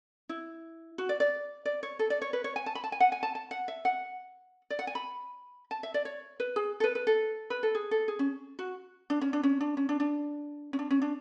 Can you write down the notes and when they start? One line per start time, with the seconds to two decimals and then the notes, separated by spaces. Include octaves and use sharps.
0.29 E4
0.98 F#4
1.09 D5
1.20 D5
1.65 D5
1.83 C#5
1.99 A4
2.10 D5
2.22 C#5
2.33 B4
2.44 C#5
2.56 G#5
2.66 A5
2.75 B5
2.84 A5
2.92 G#5
3.00 F#5
3.12 G#5
3.23 A5
3.35 A5
3.51 F#5
3.68 E5
3.85 F#5
4.70 D5
4.79 F#5
4.87 G#5
4.95 B5
5.71 A5
5.83 E5
5.94 D5
6.05 C#5
6.40 B4
6.56 G#4
6.80 A4
6.84 B4
6.95 B4
7.07 A4
7.50 B4
7.63 A4
7.75 G#4
7.91 A4
8.08 G#4
8.19 C#4
8.59 F#4
9.10 D4
9.21 C#4
9.33 D4
9.43 C#4
9.61 D4
9.77 C#4
9.89 D4
10.00 D4
10.73 C#4
10.79 D4
10.91 C#4
11.02 D4